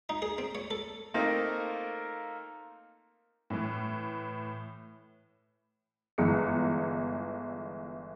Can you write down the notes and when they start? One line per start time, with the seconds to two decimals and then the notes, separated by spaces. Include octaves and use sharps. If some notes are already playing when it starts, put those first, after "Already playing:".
0.09 D#4
0.22 G#4
0.38 C4
0.55 C#5
0.71 A4
1.14 A3 A#3 C4 D#4 F4 A#4
3.50 A2 E3
6.18 G1 E3 G#3 C#7